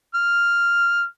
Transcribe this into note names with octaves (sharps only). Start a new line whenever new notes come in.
F6